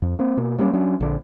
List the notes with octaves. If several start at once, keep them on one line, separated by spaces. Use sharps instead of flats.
F2
A#3 C4
B2 A#3
F#3 G3 A#3 C#4
F#3 C#4 D4
A#1 D3